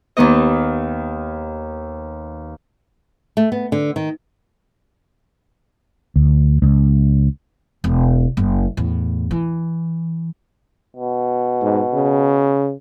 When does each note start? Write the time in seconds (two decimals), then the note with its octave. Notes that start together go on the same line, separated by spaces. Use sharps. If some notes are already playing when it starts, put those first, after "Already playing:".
0.17 D#2 D#3 B3 D#5
3.37 A3
3.52 B3
3.72 D3
3.96 D#3
6.16 D2
6.62 C#2
7.84 E1
8.37 F#1
8.77 E2 A2
9.31 E3
10.96 B2
11.61 G#2
11.93 C#3